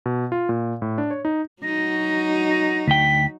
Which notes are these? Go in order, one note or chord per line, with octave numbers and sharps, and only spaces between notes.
B2
F4
A#2
A2
D4
C#5
D#4
F#3 D#4 F#4 A#6
A#6
D2 G5 B6